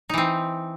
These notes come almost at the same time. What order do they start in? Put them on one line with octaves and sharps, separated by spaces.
D#4 E3 C4